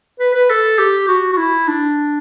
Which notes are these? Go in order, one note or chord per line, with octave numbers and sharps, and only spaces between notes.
B4
B4
A4
G4
F#4
F#4
E4
D4